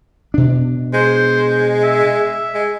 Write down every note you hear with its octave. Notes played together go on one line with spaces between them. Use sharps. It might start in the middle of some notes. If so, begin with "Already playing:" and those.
B2 D4
G#3 C5
E5
G#3